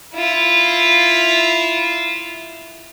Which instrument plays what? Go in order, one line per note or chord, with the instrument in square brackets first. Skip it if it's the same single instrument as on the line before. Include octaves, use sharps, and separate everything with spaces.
[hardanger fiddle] E4 F4